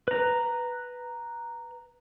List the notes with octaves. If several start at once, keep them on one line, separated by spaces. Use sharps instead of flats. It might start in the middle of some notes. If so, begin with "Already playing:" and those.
B4 A#5